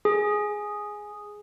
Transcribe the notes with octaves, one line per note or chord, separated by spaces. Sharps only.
G#4